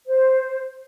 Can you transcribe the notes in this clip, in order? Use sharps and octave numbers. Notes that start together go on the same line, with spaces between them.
C5